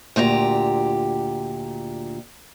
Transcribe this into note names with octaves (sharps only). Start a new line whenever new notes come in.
D2 A#2 G4 A#5